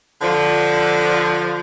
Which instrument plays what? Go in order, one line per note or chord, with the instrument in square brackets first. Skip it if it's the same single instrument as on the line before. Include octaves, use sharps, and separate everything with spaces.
[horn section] D3 F3